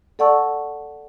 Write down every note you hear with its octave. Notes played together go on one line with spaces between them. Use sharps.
A4 D5 F#5 A5 C#6 E6